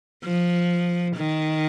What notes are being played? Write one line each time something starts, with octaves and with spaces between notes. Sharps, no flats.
F3
D#3